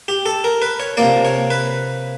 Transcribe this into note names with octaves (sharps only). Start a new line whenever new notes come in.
G4
A4
A#4
B4
C#5
C3 F3 A#3 D5
C#5
B4